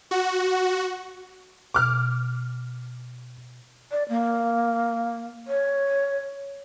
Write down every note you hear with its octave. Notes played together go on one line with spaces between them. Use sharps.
F#4
B2 D6 F6
D5
A#3
C#5